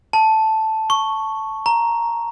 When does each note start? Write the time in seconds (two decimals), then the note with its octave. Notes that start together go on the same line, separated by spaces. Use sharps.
0.13 A5
0.90 C#6
1.66 A#5